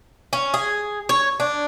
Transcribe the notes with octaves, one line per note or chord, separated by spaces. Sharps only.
C#4
G#4
C#5
D4